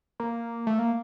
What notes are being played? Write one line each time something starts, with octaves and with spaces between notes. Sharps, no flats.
A#3
A3
A#3